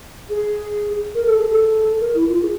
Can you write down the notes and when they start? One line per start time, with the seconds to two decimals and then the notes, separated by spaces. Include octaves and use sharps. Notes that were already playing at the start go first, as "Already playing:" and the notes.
0.30 G#4
1.15 A#4
1.26 A4
1.37 G#4
1.49 A4
1.92 A4
2.00 A#4
2.15 E4
2.29 F4
2.43 G#4